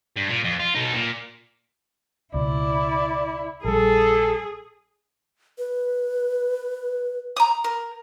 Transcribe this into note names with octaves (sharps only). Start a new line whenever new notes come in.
G2
A#2
F2
F4
B2 D#4
A#2
C#2 B2 E4 D5
A#1 G3 G#4 A4
B4
A#5 D#6
A#4